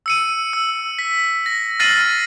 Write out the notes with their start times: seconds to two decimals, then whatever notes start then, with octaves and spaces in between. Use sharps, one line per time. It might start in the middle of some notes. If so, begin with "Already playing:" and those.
0.06 E6 C#7 D#7
0.53 E6
0.99 B6
1.46 A#6
1.80 F6 A6 A#6 C7 D#7 F#7